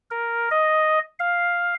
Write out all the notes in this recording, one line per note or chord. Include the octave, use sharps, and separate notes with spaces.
A#4
D#5
F5